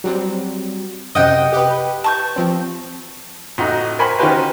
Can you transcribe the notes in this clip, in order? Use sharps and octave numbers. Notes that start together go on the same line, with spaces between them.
F#3 G3 C4
F#2 C3 D#5 F#5 G5
G4 B4
A5 C#6 G6
F3 C4
A1 D#4 F#4
A#4 C5 G5 G#5 B5 C#6
D#3 C#4 F#4 G4 B4 C5